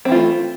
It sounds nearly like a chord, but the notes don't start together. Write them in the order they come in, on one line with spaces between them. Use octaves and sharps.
C4 E3 F4 A3